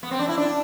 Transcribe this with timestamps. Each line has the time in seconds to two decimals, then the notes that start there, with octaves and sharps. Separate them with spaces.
0.03 B3
0.11 C4
0.19 D4
0.28 E4
0.37 D4